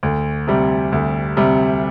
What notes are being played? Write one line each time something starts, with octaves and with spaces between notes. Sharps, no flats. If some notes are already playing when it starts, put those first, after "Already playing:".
D2
C3 G3
D2
C3 G3